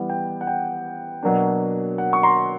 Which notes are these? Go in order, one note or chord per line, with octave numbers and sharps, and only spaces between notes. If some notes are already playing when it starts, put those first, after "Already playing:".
Already playing: E3 G3 B3 E4 F#5
G5
F#5
G5
B2 F#3 A#3 D4
F#5
C#6
A#5 C6